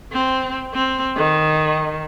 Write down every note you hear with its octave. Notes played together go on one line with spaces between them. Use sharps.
C4
C4
D#3